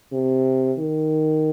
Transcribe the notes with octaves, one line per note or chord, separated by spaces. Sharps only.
C3
D#3